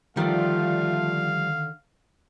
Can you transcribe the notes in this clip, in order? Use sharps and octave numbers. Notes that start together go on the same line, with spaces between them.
D3 D#3 F3 G3 A3 F4 F5